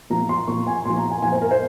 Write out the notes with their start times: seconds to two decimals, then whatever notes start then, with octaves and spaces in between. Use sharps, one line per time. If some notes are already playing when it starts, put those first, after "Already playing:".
0.10 A#2 F3 A#5
0.29 C6
0.48 A#2 F3 C#6
0.67 G#5
0.85 A#2 F3 C6
0.98 A#5
1.10 G#5
1.22 A#2 F3 G#5
1.32 C5
1.42 A#4
1.51 C5